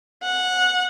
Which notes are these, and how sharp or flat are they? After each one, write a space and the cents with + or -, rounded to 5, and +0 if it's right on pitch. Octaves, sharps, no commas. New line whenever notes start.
F#5 -15